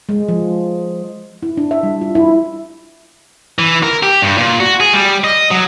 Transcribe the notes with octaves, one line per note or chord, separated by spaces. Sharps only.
G#3
F3
E4
D4
E5
G3
F4
E4
E3
A#4
G4
G2
A#2
F#4
G#4
G3
D#5
F#3